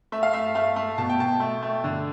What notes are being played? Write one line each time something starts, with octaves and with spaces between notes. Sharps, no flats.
A3 E5
F5
A3 E5
A3 F5
A3
B2 A5
G5
B2 A5
A3
A3
D3